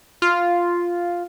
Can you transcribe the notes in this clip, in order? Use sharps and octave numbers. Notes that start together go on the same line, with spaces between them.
F4